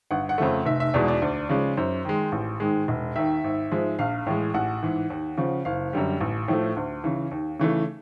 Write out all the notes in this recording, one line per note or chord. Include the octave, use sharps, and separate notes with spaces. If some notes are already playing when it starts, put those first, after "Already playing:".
G1 F#5
F#5
F2 C#3 F3 A3
F1 E5
E5
E2 B2 G#3 D5
D5
D2
C#3 F3 G#3
F#2 C5
D#3 G#3
A1
G#2 D#3 G#3
E1
D#2 D#3 E5
G#1
G#2 F3 G#3
A#1 F5
A2 E3 G#3
A1 F#5
G#2 E3
D#2
C#3 F3
F#1 F5
F#2 D3 G3
A1
A2 F3 A3
D2
C#3 E3
D#2
C#3 E3 A3